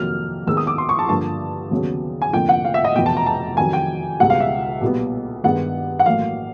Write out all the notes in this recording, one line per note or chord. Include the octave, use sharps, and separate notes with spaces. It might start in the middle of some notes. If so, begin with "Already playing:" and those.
Already playing: F2 C3 D#3 F#3 A#3 F6
D#2 D#3 G#3 B3 E6
D#6
D6
C6
C#6
A5
G2 D3 F3 A#3 A5
D#2 C#3 F#3 B3
G#5
F1 F2 D3 F3 A#3 G5
F#5
F5
E5
D#5
F1 E2 B2 G5
A5
A#5
A5
F2 C3 D#3 F#3 G#5
G5
C#2 B2 G3 F#5
F5
E5
B1 A#2 G3 B3
G2 D#3 G#3 B3 F#5
F#5
A1 A2 F#3 A#3 F5